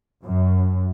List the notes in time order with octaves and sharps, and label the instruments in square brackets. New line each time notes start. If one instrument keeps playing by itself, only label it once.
[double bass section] F#2